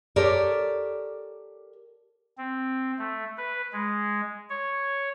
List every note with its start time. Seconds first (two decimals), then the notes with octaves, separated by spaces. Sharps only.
0.16 G4 A4 A#4 C#5 D5
2.38 C4
2.99 A3
3.38 B4
3.73 G#3
4.49 C#5